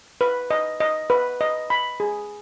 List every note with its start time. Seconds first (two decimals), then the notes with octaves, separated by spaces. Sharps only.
0.21 B4
0.51 D#5
0.80 D#5
1.10 B4
1.41 D#5
1.70 B5
2.00 G#4